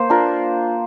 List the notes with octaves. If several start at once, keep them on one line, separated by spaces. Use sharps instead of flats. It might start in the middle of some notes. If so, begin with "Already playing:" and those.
Already playing: A#3 C5
D4 F4 A#4